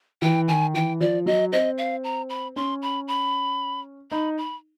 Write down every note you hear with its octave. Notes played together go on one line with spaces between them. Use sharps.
E3 G5
D#3 G#5
E3 G5
F3 D5
F#3 D#5
C4 D#5
F5
A#5
B5
C#4 C6
B5
B5
D#4 B5
B5